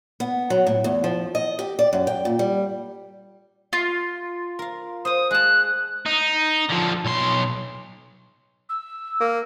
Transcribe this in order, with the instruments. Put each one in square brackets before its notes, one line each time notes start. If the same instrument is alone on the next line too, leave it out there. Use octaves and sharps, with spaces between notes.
[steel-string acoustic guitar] B3
F#3
A2
E2
F3
D#5
G4
D5
F#2
G5
A#2
G3
[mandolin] F4
[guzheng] A#4 F5
[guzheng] C5 F5 [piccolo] D#6
[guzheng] G#3 A5 [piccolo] F#6
[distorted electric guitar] D#4
D3 F3
B1 C6
[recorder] E6
[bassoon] A#3